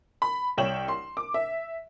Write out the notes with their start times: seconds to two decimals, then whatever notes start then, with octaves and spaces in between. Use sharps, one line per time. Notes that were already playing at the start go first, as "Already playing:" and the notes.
0.22 B5
0.57 C2 C#5 G5 E7 F#7
0.88 C6
1.17 D6
1.34 E5